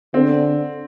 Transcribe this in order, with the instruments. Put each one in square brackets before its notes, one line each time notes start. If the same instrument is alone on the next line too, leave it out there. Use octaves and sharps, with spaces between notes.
[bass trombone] D3 [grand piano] C4